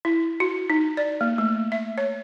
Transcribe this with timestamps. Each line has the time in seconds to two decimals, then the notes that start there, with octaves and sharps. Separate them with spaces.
0.05 E4
0.40 F#4
0.70 D#4
0.97 D5
1.21 A#3
1.38 A3
1.72 E5
1.98 C#5